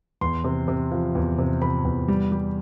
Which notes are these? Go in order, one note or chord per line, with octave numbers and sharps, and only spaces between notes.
E2 C6
C3
C3
F3
E2
C3
C3 B5
E2
G3
G3